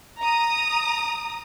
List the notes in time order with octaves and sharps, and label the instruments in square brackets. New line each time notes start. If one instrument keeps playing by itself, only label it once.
[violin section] A#5 D#6